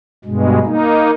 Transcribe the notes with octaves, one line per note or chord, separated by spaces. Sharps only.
G2 B2 G#3
A#3 D#4